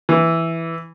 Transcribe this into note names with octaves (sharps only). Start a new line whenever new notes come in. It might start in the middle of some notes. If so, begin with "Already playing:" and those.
E3